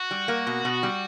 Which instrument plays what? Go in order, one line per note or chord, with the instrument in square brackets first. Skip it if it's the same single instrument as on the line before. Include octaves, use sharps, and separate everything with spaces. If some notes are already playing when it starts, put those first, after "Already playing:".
Already playing: [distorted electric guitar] F#4
[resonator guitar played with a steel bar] G3
A#3
B2
B2
G3